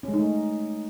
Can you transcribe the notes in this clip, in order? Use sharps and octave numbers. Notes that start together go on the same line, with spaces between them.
C#4
G#3
D#4
A3